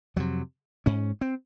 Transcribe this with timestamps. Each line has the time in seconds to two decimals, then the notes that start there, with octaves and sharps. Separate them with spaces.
0.16 F2 C3 F#3
0.86 G#2 C#4
1.21 C4